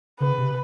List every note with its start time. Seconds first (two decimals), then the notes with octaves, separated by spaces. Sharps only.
0.20 C#3 B4
0.38 C3